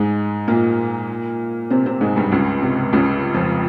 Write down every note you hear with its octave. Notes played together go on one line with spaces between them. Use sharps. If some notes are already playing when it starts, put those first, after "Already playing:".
Already playing: G#2 G#3
A#2 A#3
C3 C4
C3 C4
G#2 G#3
G2 G3
C#2 C#3
C3
C#2 C#3
F2 F3